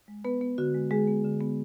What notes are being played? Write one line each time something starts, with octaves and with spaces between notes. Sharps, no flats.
G#3
B3 B4
B3
D3 F#4
G#3
D3 G#3 G#4
B3
D3
B3